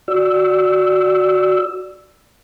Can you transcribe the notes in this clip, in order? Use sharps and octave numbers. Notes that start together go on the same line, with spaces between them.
F#4 D5 E6